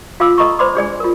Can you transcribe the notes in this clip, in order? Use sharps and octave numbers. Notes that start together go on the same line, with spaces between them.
F4 F5 A5 D6 E6
A4 D#5 A#5 B5 C#6
C5 D5 B5 C6 D6
D4 G#4 D5 G#5
F4 A#4